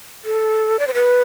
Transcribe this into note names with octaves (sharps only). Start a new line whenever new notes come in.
A4
D5
C5
B4